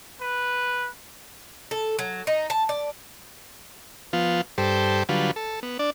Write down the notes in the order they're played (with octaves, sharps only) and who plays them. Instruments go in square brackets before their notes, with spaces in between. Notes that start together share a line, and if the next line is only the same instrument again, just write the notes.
[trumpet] B4
[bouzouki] A4
F#3
D#4
A5
D5
[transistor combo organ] F3 B3 F4
G2 G4 A4 C5
D3 F#3 G3 F4 B4
A4
B3
D4 D5